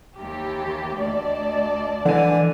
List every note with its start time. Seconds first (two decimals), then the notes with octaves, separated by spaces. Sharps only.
0.18 D#2 E3 G4
0.96 D2 D5 D#5 A5
2.05 D3 E3 G#5